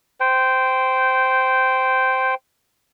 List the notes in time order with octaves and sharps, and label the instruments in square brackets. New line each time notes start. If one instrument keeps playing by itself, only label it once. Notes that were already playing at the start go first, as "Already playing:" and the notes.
[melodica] C5 G5